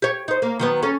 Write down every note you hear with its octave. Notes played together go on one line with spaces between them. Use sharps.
G4 C#5
D#4 C5
A#3
D#3 F#3 B3
C#4 A4